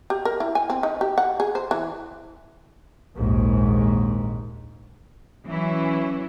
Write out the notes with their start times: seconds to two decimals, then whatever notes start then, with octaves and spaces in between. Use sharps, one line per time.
0.10 G4
0.25 A#4
0.40 E4
0.55 G#5
0.70 C4
0.83 D#4
1.01 G4
1.18 F#5
1.40 G#4
1.55 C5
1.71 E3
3.17 A#1 D#2 G#2
5.47 E3 F#3 C#4 E4